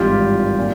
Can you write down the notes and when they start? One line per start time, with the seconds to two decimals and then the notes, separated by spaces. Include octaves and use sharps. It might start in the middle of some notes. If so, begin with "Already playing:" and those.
Already playing: G#1 G2 E3 F4 G4
0.59 A#2